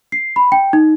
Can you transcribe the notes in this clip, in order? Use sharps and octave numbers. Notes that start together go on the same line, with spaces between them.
C7
B5
G5
D#4